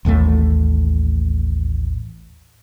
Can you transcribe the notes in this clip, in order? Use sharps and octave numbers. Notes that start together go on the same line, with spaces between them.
A1 D#2 A2 A3